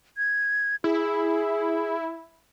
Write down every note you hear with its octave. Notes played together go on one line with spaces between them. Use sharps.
G#6
E4 G#4